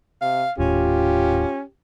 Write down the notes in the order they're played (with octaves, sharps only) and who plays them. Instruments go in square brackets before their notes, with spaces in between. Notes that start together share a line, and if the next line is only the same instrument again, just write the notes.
[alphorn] C3 [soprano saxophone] F5
[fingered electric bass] D#1 D#2 A2 [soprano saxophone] C#4 [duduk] F4 [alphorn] G4